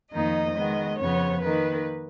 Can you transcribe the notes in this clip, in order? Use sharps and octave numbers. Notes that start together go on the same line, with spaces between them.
F2 D#3 A#3 D#4 D#5
D#3 G#3 B3
F2 C#3 F3 B3 C#5
D#3 A#3 D#4 B4